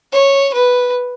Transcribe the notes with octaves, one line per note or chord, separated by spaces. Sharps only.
C#5
B4